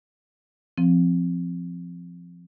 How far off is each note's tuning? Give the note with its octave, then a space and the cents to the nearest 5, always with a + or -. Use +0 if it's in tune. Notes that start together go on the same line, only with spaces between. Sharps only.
F3 -10 C4 +0